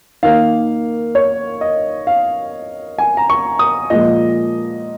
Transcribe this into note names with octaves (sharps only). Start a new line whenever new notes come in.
D#3 A#3 F5
C#5
D#5
F5
G#5
A#5
C#6
D#6
A#2 F3 G#3 D#5